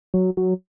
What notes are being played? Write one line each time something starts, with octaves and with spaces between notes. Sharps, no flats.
F#3
F#3